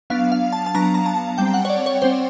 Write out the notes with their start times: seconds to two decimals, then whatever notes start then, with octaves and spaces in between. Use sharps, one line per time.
0.10 F#3 B3 D4 F5
0.32 F5
0.53 A5
0.66 A5
0.74 F#3 B3 D4 A#5
0.94 A#5
1.06 A5
1.38 G3 C4 G5
1.54 F#5
1.65 C#5
1.69 D5
1.86 C#5
2.02 G3 C4 C5